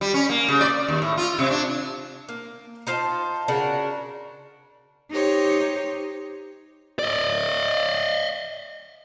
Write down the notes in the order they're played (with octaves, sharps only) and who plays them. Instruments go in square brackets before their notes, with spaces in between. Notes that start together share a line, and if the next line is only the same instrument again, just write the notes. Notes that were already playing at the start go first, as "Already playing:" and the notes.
[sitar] G3
C#4
A#3
C#3
D5
D#2
A2
F4
C3
D4
[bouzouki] A#3
D#4 F4 C5 A5
C#3 D4 F#4 A#4
[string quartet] D#4 G4 C5 C#5
[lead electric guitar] D5 D#5